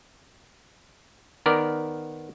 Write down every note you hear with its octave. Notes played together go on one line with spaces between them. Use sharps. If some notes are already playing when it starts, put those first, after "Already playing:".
D#3 B3 A#4 D5